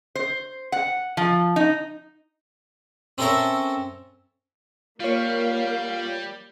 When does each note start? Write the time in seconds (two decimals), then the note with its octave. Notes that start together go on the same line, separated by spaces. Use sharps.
0.15 C5
0.72 F#5
1.17 F3
1.56 D#4
3.18 C4 C#4 A4 A#4 E5 A#5
5.00 G3 A#3 F4 C#5 F5